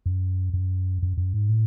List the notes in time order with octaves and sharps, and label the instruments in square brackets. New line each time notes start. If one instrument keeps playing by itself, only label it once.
[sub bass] F#2
F#2
F#2
F#2
G#2
A2